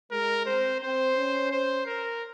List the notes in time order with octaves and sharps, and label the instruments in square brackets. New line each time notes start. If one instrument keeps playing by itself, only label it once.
[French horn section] G#3 [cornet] A#4
[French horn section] C4 [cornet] C5
[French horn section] C4 [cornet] C5
[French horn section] C#4
[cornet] C5
A#4